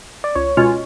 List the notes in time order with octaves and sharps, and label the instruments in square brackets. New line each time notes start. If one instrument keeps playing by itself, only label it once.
[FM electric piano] D5
[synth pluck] C#2 [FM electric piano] C#5
[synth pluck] B2 G#3 C#4 F4